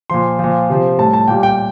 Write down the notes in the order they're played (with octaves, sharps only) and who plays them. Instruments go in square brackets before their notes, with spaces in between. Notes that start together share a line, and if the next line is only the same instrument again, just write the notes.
[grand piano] A#2 F3 C6
A#2 F3
C3 F3
A2 G3 A5
A5
A#2 G3 G5
G5